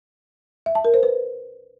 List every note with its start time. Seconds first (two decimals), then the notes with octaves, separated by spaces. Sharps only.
0.66 E5
0.75 A5
0.85 A#4
0.94 C5
1.03 B4